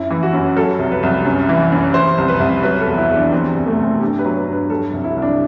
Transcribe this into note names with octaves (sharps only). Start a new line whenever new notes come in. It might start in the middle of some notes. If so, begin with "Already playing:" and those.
Already playing: F#2 E4
E3
F#4
F#2
F#3 A4
C2
B4
C2
F#2
E3
F#2
E3 C5
C2
B4
C2
F#3 B4
A4
E2
E4
E2
D4
E3 C4
C2
A3
C2
C4
G2 G4
B4
F#3
B4
G2
B4
F#3 A4
C2
E4
C2
D4